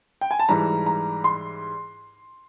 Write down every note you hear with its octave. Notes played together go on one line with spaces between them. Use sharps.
G5
G#5
A5
G#2 E3 G3 A#5
A#5
C6